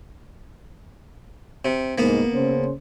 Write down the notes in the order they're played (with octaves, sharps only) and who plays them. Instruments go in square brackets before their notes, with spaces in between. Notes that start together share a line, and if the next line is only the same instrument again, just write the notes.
[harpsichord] C3
[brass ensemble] C2 G#2 [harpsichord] A#3 B3
[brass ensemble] C#3 C#4 C5